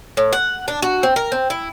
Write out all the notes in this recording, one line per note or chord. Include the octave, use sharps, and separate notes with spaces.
A2
F#5
D4
F#4
C4
A#4
C4
E4